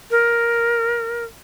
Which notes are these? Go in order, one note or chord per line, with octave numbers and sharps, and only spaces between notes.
A#4